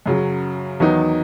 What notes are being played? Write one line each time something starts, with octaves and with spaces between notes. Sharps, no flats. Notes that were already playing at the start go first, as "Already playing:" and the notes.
F#2 C#3 F#3
E2 D#3 F#3 B3 D#4